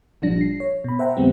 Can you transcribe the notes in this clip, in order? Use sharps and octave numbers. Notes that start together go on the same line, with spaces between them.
G1 A#2 F3 G3 D4 A#6
C7
C#5
B2 B5
C5 E5 F#5 G5 A#5
F2 D3 G3 G#3 B3 C4